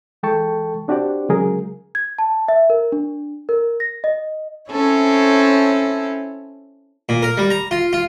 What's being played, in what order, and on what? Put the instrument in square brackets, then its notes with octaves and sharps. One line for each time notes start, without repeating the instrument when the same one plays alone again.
[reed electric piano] E3 G#3 A4 G5 A5 C#6
C4 D4 F#4 G4 C5 D5
C#3 F#3 G#3 G#4 A#4
[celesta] G#6
A5
E5
A#4
D4
A#4
A#6
D#5
[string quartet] C4 C#4 E4 A4 C#5
[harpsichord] A#2
A#4
G3
A#5
F4
F4